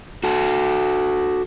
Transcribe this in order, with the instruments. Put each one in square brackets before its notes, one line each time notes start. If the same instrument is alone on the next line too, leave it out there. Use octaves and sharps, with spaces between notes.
[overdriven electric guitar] F#4 A4